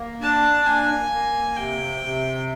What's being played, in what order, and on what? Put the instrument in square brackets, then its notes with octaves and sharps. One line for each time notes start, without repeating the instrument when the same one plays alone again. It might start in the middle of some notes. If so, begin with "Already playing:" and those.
Already playing: [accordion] A#3
[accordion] D4 [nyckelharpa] A5
[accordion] A#3 [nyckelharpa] G#5
[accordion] A#3
[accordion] C3 [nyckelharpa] G5
[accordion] C3